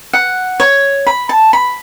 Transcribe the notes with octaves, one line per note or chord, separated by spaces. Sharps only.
F#5
C#5
B5
A5
B5